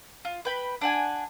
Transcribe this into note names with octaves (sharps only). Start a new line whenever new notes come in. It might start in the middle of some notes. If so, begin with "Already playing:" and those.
F4
B4 G5 B5
D4 F#5 G#5